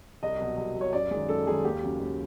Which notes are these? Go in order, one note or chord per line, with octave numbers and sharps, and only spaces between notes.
C2 D#5
B2 F#3
C2
B2 F#3 C#5
F#2 D5
D#3 G#3
F#2 A4
D#3 G#3 G#4
D#2 G4
C#3 F#3
D#2